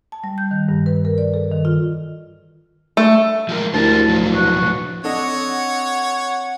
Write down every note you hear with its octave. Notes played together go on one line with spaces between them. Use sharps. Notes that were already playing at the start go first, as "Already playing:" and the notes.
A5
G3
G6
D#3
G2
B4
A#4
D5
A4
D#3
F4
A3
F3 G#3 A#4
D2 E4 G4 A#4 C5 A5
A2 F3 F#3
F#4 B4
C4 D4 A4 C#5 D#5 F#5